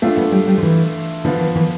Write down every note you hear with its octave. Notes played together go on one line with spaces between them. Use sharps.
A3 C4 D4 F4
B3
G3
G3
F3
E3
D3 F3 B3 F4
E3
E3